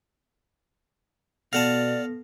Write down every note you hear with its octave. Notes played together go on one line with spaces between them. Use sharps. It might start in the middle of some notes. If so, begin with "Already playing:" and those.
B2 B3 A4 D5 F5 F#5 A5 A#6